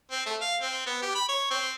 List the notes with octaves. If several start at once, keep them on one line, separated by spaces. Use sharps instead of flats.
C4
A3
F5
C4
B3
G4
B5
C#5
C4